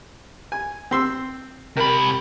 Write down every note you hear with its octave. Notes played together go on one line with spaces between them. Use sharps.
G#5
C4 C6 E6
C3 A#4 B5